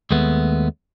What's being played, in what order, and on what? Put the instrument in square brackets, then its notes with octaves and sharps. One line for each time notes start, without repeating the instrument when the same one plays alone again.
[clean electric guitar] D#2 G#3 A3 B3